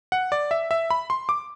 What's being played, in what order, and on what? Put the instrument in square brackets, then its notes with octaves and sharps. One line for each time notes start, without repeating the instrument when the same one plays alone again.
[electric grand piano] F#5
D5
E5
E5
B5
C6
D6